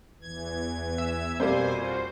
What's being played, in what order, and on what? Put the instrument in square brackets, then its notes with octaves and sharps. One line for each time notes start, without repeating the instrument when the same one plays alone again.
[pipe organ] E2 E3 G#6
[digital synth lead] E5
[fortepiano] F2 G3 A#3 [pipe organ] B2 G#5 [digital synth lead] C5
[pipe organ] F4 F#4